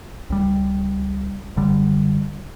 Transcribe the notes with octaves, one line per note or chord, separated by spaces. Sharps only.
C#2 G3
F#1 D3 G3